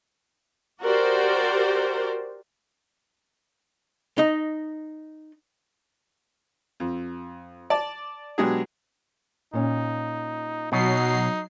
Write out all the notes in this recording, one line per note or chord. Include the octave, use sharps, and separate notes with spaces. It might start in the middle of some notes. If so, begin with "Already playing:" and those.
F#4 G4 A#4 C5 D5
D#4 D#5
F2
D5 A5
B2 F#3 G#3 D4 G4 G#4
A#2 C#4 D#4
B2 F#3 D#4 C7